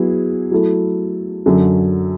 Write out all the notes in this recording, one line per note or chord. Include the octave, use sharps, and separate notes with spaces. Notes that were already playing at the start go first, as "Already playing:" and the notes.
Already playing: F#3 B3 E4 G#4
F#3 A3 E4 A4
F#2 D3 F#3